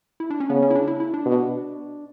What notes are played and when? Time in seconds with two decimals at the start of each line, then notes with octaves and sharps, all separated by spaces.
0.20 E4
0.30 D4
0.40 C#4
0.50 C#3 B3
0.62 C#4
0.70 E4
0.75 D4
0.88 E4
1.00 E4
1.14 D4
1.26 B2